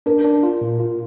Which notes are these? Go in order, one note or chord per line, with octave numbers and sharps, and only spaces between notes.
D4 A#4
D4
F4
A#2
F4